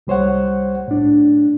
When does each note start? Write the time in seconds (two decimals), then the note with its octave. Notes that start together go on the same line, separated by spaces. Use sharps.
0.07 C2 G3 C5 C#5 F#5
0.88 A2 D4